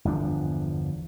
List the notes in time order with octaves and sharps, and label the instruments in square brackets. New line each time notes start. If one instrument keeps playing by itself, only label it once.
[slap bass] G1 E2 F3 D4